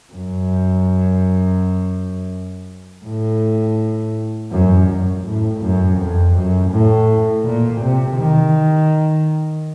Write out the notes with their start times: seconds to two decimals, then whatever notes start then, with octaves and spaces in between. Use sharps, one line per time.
0.13 F#2
3.05 A2
4.51 F#2
4.88 F#2
5.25 A2
5.61 F#2
5.98 F2
6.34 F#2
6.70 A2
7.44 A#2
7.81 C3
8.17 D#3